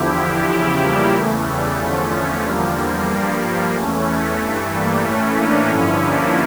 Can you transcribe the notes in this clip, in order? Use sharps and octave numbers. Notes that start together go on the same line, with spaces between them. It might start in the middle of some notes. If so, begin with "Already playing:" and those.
Already playing: E2 D3 F3 E4 G4
E2 C#3 F3 E4 G4
G3 A#3
E2 C#3 E3 A3
G3
E2 D3 F3 A3 C#4
E2 D3 F3 G3 A#3
G3
G2 F3 G3 A#3
G3 A#3
E2 E3 A3 C#4
A3
G2 E3 A3
G3 A#3
A2 E3 A3 C#4
A#3 D4
G2 D3 F3 C#4 E4
A#3 D4